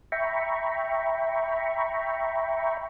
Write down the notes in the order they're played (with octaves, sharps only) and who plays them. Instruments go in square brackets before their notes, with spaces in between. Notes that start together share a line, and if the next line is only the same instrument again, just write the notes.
[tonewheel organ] E5 G5 A#5 B5 C#6